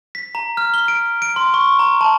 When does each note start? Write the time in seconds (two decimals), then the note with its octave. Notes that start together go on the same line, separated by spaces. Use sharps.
0.15 B6
0.35 A#5
0.57 F6
0.74 G7
0.88 D7
1.22 D7
1.36 C6
1.54 C#6
1.79 A#5
2.01 A5